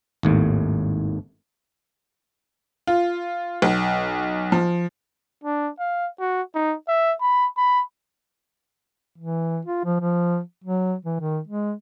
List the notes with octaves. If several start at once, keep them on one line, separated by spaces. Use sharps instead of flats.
G#1 D#2 A2
F4
B1
F3
D4
F5
F#4
D#4
E5
B5
B5
E3
F4
F3
F3
F#3
E3
D#3
G#3